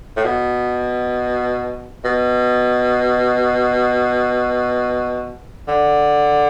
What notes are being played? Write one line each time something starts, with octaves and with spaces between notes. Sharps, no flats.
A2
B2
B2
D3